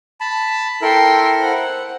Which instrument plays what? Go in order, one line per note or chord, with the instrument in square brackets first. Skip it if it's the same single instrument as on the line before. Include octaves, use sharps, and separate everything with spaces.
[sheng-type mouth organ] A5 B5
[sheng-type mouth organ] E4 A4 A#4 [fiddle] G5 C6
[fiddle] C5 F#5